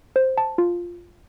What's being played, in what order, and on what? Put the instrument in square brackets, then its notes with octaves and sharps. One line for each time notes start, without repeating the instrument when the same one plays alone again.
[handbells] C5
A5
F4